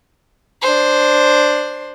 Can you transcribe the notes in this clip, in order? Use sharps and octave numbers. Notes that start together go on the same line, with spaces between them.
D4 C5